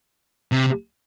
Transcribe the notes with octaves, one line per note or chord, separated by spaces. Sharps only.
C3